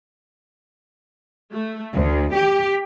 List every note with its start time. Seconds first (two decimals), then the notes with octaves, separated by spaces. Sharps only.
1.53 A3
1.94 D2
2.35 G4